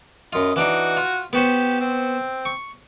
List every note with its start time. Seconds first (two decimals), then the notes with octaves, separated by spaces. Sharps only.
0.33 F#2 F4 D#5
0.56 E3 D4 D#4 F#4
0.97 F4
1.33 B3 F#4 G4 C5
1.80 C4
2.45 C#6